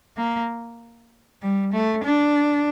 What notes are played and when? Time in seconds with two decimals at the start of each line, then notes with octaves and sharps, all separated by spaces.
0.17 A#3
1.42 G3
1.73 A3
2.04 D4